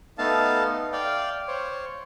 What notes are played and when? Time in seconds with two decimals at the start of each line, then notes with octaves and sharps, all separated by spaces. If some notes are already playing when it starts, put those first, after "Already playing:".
0.18 A3 B3 D#4 F5 A5
0.92 D5 F5 G5
1.48 C5 C#5